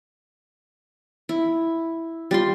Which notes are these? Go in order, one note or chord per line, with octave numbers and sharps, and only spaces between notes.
E4
G3 F4 C6